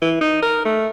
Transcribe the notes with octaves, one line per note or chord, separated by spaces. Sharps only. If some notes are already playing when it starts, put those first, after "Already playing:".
E3
D#4
A#4
A3